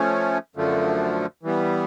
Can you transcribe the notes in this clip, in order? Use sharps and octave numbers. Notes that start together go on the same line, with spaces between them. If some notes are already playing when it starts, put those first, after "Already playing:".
Already playing: F3 A3 C#4
F#2 D3 F3 A3
E3 G3 B3